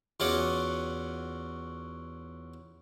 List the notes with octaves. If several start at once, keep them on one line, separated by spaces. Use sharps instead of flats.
E2 C#4 F4 F#4 F#5 D6